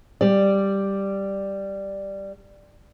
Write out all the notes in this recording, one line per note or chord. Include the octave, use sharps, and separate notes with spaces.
G3 D5